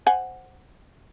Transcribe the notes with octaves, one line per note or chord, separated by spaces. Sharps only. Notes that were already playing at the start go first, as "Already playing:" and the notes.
C5 F#5 G#5